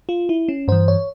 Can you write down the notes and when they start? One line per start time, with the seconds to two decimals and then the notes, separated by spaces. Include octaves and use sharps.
0.09 F4
0.29 E4
0.49 C#4
0.68 G2 E3 C5
0.88 C#5